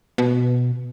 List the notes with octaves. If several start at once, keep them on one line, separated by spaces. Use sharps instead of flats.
B2